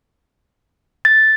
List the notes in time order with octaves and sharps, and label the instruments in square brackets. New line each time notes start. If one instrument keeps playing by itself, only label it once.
[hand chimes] A6